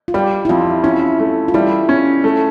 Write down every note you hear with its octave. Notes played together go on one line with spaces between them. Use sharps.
F4
G3 G4
E4
F2 F4
C#4 E4
A3
F4
G3 E4
C#4
A3